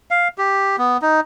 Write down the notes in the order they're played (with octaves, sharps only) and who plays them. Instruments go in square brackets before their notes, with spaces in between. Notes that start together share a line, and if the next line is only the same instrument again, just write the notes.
[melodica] F5
G4
B3
D#4